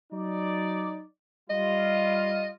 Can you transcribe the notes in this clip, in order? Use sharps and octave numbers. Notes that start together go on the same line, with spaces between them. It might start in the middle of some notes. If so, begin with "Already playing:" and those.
F#3 D#4 D5
G3 F4 D#5